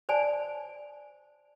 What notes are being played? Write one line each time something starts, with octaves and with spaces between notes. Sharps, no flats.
C5 D5 G#5 A5